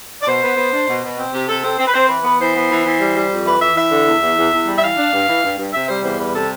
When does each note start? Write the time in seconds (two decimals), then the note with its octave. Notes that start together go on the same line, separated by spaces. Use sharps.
0.22 D5
0.27 B2 C5
0.42 B3
0.57 B3
0.72 D4
0.88 B2
1.03 B2
1.18 C4
1.33 C3 G4
1.48 C3 A4
1.63 C4 A4
1.78 C4 C5
1.87 B4
1.94 C4 C5
2.08 E3 B4
2.24 B3 B4
2.39 E3 C5
2.55 B3
2.69 E3
2.85 E3
3.00 G3
3.16 G3
3.30 F2
3.46 E3 B4
3.60 E3 E5
3.76 E3 E5
3.91 D3
4.06 E2
4.22 E2
4.37 E2
4.52 E2
4.67 G3
4.77 E5
4.83 E3 F5
4.97 D4
5.13 G2
5.28 E3
5.43 G2
5.58 G2
5.73 C3 E5
5.88 G3 C5
6.03 E2 C5
6.19 G3 B4
6.34 C3 A4